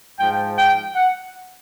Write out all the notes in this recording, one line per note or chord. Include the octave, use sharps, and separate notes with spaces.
G#2 F3 G5
G5
F#5